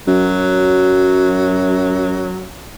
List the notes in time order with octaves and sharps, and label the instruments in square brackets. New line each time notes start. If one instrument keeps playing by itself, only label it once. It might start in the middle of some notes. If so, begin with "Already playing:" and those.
[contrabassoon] F#2 [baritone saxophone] F#3